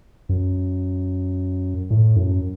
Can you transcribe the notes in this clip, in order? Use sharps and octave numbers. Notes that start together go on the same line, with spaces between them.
F#2
A2
F#2